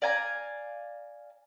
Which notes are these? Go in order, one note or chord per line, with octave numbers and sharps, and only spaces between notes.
D5 F5 G#5 A#5